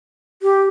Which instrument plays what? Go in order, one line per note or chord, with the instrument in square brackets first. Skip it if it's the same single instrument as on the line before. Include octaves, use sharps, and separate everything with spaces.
[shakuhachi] G4